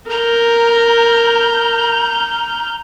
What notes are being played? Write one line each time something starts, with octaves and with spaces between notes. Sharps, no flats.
A#4 A#5 F6 G6